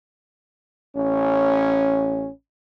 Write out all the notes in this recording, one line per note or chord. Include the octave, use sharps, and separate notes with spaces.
A1 C#4